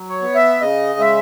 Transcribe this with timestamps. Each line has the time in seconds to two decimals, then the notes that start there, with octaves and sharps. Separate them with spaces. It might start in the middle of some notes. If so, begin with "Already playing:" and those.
Already playing: F#3
0.09 C#5
0.22 B3
0.35 E5
0.61 C#3 D#5
0.99 G#3 E5